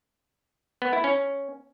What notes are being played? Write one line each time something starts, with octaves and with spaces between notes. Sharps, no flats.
B3
E4
C#4